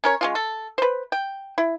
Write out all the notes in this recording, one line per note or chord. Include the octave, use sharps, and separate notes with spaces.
C#4 A#4 C#5
G#3 C#4 F4
A4
B4 C5
G5
E4